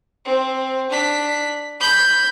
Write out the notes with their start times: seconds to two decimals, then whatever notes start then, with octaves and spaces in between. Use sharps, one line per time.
0.25 C4
0.90 D4 B6
1.80 B5 G6